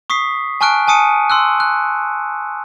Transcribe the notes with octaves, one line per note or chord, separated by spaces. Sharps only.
C#6 D#6 B6 C7
G#5 A5 C#6 F6 F#6 D7
G#5 A5 D#6 C#7 D#7
C6 E6 F#6
F#6